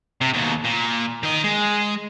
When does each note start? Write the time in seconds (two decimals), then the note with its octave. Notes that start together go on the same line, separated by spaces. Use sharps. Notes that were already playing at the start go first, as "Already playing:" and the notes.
0.21 C3
0.34 D#2 B2
0.65 A#2
1.23 D#3 D#5
1.44 G#3